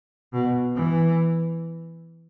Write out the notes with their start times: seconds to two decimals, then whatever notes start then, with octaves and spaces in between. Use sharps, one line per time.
0.33 B2
0.75 E3